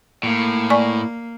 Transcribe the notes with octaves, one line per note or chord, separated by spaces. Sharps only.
A2 A#3
D5 G#5 C#6